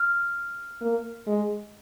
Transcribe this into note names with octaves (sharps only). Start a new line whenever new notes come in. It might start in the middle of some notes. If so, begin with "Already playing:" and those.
Already playing: F6
A#3
G#3